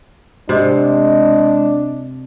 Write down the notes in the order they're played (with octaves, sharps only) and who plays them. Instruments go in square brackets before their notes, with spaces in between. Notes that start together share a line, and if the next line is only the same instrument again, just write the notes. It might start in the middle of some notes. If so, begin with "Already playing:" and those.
[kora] C3 [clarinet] G#3 [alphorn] D4